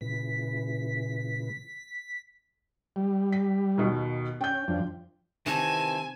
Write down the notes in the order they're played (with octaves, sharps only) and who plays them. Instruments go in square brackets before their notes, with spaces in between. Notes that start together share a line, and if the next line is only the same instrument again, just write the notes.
[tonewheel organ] A#2 C#3 E3 [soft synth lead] B6
[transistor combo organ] G3
[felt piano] B6
D#2 B2
[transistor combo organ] C#4 [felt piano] G5 G6
[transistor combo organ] F2 F3 D4
[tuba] C3 [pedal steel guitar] D#3 E3 C4 [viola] G#5 [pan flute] A5